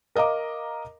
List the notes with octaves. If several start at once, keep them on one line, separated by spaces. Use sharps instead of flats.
A#4 D#5 F5 A#5 D6